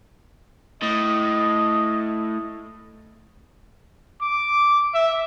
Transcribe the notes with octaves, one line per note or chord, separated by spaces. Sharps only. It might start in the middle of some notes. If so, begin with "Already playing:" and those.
A2 D#5
D6
E5